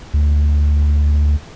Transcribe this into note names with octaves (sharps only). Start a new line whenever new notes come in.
D2